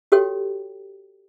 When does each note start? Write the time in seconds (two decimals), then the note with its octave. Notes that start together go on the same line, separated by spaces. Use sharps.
0.12 F#4 G4 A4 C#5 G5